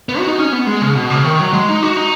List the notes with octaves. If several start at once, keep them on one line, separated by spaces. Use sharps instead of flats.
B3
F#4
D#4
C#4
B3
G#3
C#3
B2
C#3
D#3
F#3
G#3
D#4
F#4
D#4